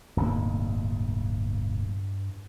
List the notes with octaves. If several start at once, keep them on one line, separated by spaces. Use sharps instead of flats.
D1 B1 G2 A#3